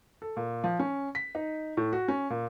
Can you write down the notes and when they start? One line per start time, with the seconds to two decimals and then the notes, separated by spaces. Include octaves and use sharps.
0.22 A4
0.37 A#2
0.64 F3
0.79 C#4
1.15 B6
1.35 D#4
1.77 A2
1.93 F#4
2.08 C#4
2.30 A#2